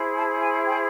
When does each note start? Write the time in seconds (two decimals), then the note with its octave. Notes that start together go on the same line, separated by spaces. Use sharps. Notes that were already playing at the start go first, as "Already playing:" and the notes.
Already playing: E4 G#4 C5
0.16 A5
0.41 G#5
0.65 G5